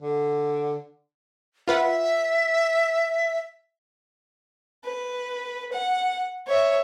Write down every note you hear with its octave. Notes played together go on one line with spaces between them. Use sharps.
D3
F4 B4 E5 F#5
B4
F#5
C#5 E5